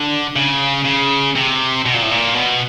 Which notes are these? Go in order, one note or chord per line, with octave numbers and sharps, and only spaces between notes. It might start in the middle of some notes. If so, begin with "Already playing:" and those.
Already playing: D3
C#3
C#3
C3
B2
A#2
A2
A#2
B2